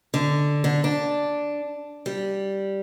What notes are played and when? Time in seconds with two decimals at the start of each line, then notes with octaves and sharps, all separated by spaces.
0.14 D3
0.64 D3
0.84 D4
2.06 G3